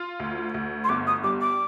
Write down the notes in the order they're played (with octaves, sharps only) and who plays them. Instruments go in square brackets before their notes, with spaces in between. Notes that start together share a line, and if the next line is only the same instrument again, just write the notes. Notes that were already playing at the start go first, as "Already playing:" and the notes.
Already playing: [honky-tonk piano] F4
D2
D2
[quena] C6
[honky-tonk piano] G1 [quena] D6
[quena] D#6
[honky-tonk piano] G3 [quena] D6
[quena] D6